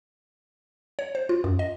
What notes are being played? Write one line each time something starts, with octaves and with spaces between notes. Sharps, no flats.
C#5
C5
F4
F#2
D#5